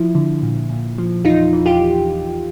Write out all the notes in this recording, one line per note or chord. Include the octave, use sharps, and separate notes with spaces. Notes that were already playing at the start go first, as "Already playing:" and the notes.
Already playing: F3 E4
D3
A#2
A#2
F3
E2 D#4 F4
E3
F4 G4